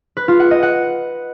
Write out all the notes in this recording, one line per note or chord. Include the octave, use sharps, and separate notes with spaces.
B4
F4
F#5
D#5
F#5